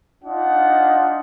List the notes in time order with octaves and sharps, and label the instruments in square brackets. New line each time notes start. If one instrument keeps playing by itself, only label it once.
[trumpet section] D4 D#4 F4 F#5